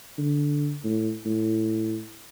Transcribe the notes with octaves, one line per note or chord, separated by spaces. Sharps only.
D3
A2
A2